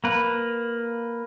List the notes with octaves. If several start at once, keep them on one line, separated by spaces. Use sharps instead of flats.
A#3 B4